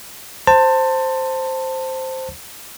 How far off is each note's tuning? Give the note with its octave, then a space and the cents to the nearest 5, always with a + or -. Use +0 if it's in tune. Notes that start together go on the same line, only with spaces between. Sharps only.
C5 +0 A5 +25